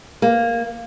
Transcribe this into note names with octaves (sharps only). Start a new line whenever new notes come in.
A#3